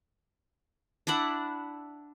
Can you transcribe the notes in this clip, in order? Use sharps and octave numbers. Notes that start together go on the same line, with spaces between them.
D4 E4 D5 F#5